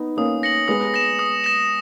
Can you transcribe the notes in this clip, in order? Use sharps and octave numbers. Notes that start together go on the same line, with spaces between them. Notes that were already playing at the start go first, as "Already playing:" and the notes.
Already playing: B3 D#4
A#3 C#4 D#6
A#6 C#7 F#7
G#3 B3 D#6
A#6 E7
D#6
A#6 E7